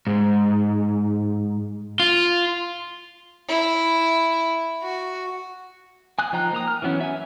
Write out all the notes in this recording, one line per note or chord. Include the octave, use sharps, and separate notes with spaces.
G#2
F4
E4
F#4
G#5 D#6 F#6
F3 D#4 G5 A#5 F#6
A#3 A#5 D#6
F6
E3 F#3 B3 C#4
E5 G#5